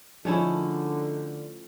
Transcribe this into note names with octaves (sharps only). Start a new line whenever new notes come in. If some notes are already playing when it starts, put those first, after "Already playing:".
D3 F3 A3 C#4 D#4 E4 G#4 D5